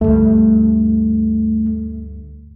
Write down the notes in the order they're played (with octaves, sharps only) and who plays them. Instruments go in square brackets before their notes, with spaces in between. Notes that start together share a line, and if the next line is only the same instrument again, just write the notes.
[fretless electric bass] D2 G2 [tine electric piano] A3